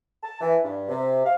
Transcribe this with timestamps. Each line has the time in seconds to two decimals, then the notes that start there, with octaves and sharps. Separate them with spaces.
0.23 A5
0.40 E3
0.63 G2
0.88 C3
1.24 F5